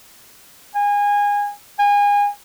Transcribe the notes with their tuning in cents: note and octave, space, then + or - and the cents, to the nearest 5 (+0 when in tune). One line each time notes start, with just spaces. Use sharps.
G#5 -25
G#5 -30